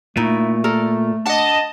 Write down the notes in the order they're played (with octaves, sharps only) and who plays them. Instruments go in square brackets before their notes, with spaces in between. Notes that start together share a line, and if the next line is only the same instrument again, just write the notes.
[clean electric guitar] A#2 [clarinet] A3 [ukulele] D#4 E4
[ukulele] A4 A#4 D5
[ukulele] D4 F#5 [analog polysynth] D#5 A5